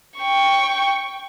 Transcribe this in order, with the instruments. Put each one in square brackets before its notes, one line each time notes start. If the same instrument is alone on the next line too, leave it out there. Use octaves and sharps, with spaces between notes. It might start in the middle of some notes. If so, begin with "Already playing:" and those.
[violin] G5 C#6